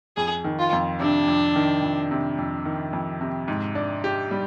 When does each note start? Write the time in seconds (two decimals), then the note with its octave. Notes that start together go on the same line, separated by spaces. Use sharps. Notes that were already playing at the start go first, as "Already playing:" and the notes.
0.17 F2 G#4
0.44 D#3
0.59 F4
0.73 F2
0.99 C3 D4
1.28 F2
1.56 D#3
1.82 F2
2.11 C3
2.38 F2
2.65 D#3
2.93 F2
3.21 C3
3.48 G#2
3.75 D4
4.04 G4
4.31 G3